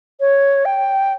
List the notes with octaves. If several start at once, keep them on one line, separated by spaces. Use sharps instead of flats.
C#5
G5